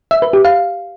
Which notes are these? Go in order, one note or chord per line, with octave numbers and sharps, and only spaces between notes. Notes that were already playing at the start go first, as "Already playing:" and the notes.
E5
B4
G4
F5